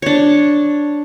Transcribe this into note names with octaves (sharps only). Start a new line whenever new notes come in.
D4 C#5